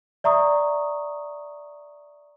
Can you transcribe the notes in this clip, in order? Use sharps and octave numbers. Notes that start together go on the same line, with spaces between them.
D5 E5 A#5 C#6 D#6